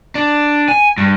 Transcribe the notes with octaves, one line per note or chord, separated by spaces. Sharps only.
D4
G#5
G2